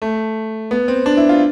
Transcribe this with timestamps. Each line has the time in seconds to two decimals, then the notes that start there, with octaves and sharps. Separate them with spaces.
0.02 A3
0.71 B3
0.88 C4
1.06 D4
1.17 E4
1.29 F4